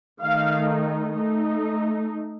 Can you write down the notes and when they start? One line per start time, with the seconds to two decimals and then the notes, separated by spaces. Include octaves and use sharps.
0.22 D#3 A3 D#4 F5
1.16 A3 D#4